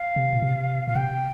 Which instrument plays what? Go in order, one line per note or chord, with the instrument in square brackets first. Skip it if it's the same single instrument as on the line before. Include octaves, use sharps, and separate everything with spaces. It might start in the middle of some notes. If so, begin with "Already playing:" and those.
Already playing: [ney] F5
[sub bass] C3
A#2
C3
[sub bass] A#2 [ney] F5
[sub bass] C3 [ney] G5